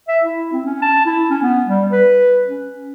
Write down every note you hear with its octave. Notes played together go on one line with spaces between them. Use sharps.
E5
E4
C4
C#4
A5
E4
C#4
B3
G3
B4
C#4